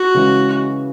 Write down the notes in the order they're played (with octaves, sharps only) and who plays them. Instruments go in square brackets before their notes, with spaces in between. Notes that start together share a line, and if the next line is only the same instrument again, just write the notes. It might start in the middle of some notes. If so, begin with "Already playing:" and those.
Already playing: [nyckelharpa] F#4
[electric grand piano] C#3 E3 G#3